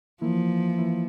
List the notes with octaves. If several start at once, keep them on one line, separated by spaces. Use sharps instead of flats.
E3 F3 A#3 E4
E3 A#3 E4